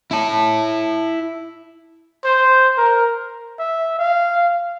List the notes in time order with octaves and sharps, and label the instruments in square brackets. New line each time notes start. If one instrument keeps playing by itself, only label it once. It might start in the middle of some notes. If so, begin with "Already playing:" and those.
[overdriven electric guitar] E4 A5
[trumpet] C5
A#4
[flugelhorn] E5
F5